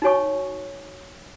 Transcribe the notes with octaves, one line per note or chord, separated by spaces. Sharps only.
D#4 F#4 C#5 G#5 C#6